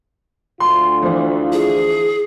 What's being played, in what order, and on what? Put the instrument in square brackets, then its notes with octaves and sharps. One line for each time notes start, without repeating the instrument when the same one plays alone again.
[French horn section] D2 F4 [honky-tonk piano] C6
[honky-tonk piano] E3 F3
[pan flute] G#4